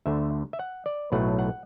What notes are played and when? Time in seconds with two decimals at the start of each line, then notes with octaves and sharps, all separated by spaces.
0.06 D2 D3 A3 E5
0.53 E5
0.59 F#5
0.86 D5
1.12 B1 A2 F#3 A3 F#5
1.39 F#5